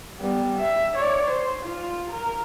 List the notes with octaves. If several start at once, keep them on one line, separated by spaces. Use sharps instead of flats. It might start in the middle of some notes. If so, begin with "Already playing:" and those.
G3 B3
E5
C#5 D5
C5
F4
A#4